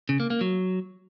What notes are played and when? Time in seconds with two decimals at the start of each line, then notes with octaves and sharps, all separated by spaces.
0.09 C#3
0.20 A#3
0.30 A#3
0.41 F#3